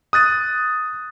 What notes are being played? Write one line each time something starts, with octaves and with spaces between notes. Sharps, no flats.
D#6 F#6 A6 D#7